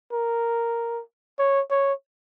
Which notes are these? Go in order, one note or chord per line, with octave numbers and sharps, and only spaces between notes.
A#4
C#5
C#5